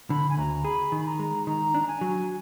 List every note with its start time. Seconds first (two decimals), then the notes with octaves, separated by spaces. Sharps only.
0.10 D3 B5
0.30 G#5
0.37 D2 A#5
0.65 G#4 B5
0.92 D#3
1.01 B5
1.06 A#5
1.19 G#3
1.47 D#3 A#5
1.74 D4
1.88 G#5
2.01 F#3